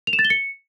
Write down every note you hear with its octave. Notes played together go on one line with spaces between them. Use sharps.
F7
E7
A6
G7
C#7